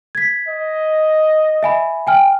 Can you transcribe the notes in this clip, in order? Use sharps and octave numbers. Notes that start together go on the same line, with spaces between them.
G#6 B6
D#5
E5 G#5 B5
G5 G#5 F6